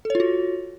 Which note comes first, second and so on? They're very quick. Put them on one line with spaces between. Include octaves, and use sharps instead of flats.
A4 C#5 F4 F#4